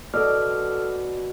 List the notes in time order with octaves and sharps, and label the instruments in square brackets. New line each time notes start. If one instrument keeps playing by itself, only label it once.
[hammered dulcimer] B2 [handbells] A4 F6 [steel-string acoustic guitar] D5